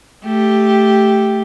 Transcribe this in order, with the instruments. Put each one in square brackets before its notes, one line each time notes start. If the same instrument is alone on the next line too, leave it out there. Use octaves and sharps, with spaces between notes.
[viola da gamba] A3 G4